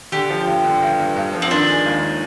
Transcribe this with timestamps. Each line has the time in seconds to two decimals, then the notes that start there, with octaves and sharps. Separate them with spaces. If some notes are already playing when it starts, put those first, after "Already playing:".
0.12 D3 G4
0.30 F3
0.47 G2
0.65 D3
0.82 G2
0.99 G2
1.16 G2
1.33 F3
1.42 C4
1.51 D#3 D4
1.68 G#3
1.86 D#2